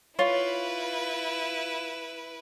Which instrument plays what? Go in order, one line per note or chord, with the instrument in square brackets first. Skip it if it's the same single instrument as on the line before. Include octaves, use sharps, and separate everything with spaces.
[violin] E4 B4 [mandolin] F4 [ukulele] C#5